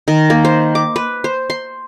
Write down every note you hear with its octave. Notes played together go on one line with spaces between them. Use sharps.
D#3
A#3
C5
D6
B4
C5
C6